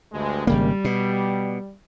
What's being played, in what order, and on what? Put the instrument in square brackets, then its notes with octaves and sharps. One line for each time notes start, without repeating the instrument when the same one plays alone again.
[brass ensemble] D2 G2 G#3
[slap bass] G#1 C#3 A#3 [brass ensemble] G3
[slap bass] B2